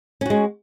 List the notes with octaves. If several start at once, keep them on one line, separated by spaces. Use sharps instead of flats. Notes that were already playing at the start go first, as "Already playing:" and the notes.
G#3 C#4 F#4